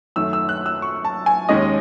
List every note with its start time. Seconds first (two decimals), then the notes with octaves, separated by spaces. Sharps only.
0.16 F#2 D#3 A3 E6
0.33 E6
0.49 F#6
0.66 E6
0.82 C#6
1.05 A5
1.26 G#5
1.49 D#2 D#3 G#3 C#4 D#5